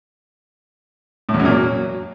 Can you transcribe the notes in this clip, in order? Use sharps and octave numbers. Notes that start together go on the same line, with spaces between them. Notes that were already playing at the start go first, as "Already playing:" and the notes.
A2
E2
F#2
A#2
F#3